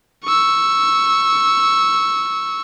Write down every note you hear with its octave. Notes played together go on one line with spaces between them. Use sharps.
C#6 E6